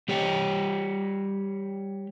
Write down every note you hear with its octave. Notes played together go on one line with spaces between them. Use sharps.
G3 G4 C#5 G5